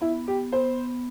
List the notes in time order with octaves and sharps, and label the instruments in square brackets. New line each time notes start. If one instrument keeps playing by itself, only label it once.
[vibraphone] B3 [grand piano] E4
[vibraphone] B3 [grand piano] G4
[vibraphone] B3 [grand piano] C5